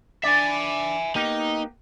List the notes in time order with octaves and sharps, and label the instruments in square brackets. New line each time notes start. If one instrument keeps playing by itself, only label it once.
[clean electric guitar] D4 D5 [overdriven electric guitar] E5 G#5
[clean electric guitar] A#3 B3 G4 [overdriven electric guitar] D#4